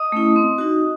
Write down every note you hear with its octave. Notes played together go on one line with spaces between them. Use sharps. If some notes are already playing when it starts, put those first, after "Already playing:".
Already playing: D#5 D#6
A3 C#4 E4
C4
D#4 F#4